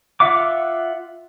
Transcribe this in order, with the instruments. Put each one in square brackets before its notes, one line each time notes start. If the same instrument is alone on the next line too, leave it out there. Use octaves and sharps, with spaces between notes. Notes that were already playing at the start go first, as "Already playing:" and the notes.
[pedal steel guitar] F4 E5 F#5 D6